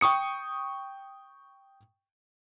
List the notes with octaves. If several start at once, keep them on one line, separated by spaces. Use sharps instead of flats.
G5 C#6 D#6 C#7